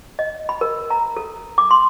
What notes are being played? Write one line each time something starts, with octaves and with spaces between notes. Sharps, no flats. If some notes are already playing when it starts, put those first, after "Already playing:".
D#5
B5
A#4
A#5
A4
D6
C6